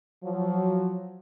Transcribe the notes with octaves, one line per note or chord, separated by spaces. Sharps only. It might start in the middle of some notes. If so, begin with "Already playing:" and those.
F3 F#3